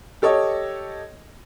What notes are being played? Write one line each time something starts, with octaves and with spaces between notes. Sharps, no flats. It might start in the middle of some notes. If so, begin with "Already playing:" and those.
G4 A4 C#5 D#5